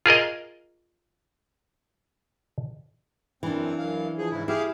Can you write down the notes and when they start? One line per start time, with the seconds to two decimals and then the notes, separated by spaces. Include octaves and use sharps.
0.06 F4 G#4 A#4 D#5
3.43 F#2 E3 C4 D4
3.78 F#2 F5
4.18 F3 G#4
4.31 G#2 C#3 E4
4.48 E4 G4 G#4 F5